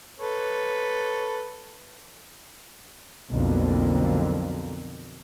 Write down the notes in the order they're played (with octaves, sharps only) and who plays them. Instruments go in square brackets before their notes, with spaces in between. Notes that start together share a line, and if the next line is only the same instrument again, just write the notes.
[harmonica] A4 B4 C#5
[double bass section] B1 F2 D3 A#3